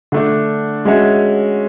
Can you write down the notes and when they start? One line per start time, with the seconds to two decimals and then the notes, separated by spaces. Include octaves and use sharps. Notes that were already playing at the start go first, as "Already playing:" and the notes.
0.12 D3 A3 D4
0.85 G#3 C#4 F#4 C#5 E5